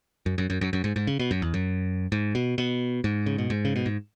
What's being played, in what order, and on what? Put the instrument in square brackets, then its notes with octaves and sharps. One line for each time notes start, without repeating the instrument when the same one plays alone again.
[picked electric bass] F#2
F#2
F#2
F#2
F#2
G#2
G#2
C#3
B2
F#2
E2
F#2
G#2
B2
B2
G#2
C#3
B2
G#2
C#3
B2
G#2